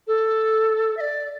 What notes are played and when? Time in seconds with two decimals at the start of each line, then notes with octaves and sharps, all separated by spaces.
0.07 A4
0.97 E5
1.00 D5